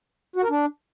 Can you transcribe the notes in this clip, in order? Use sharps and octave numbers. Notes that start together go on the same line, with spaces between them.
F#4
A#4
D4